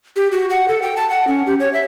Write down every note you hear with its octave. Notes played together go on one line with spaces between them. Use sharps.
G4
F#4
F#5
A4
G5
A5
F#5
C#4
G4
C#5
E5